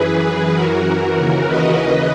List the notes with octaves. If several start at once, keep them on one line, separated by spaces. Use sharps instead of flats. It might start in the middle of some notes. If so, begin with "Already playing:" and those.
Already playing: F#2 E3 G#4 B4
G#4
F#2 E3 F#4 A#4
D#2 C#3 E3
B4 D#5
D#2 C#3 E3